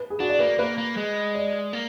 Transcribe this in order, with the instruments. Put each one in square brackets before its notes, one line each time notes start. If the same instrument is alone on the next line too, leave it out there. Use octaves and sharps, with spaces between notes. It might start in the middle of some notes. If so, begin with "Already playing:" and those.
Already playing: [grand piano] B4
G#4
[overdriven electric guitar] D4 [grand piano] F#4
[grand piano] D5
[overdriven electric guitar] A#3 [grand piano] B4
[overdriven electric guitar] A#3 [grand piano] B4
[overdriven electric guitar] A#3
G#3
[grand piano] D5
[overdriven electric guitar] A#3